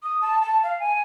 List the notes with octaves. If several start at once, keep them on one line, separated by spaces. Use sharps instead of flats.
D#6
A5
A5
F5
G#5